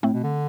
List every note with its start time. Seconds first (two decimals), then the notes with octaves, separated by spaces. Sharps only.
0.03 A2 A3 C4
0.14 B2
0.24 D3